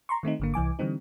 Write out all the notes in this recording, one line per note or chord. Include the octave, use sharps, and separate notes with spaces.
A#5 C6 C#6
D#3 A3 C4 D#4
G#1 D3 A#3
C2 E3 G#5 D6
D3 E3 G3 C4 D#4